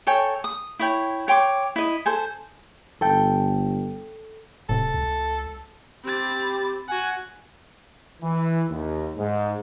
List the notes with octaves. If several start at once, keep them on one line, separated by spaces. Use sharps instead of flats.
A4 C#5 G5 G#5
D#6
E4 C#5 G5
C#5 G5 C6 D6
E4 D#5
A4 C5 G#5
G1 A4 G5
D1 A2 C3 A4
C#2
C4 G4 B5 A6
F#4 F#5 G#5
E3
D#2
G#2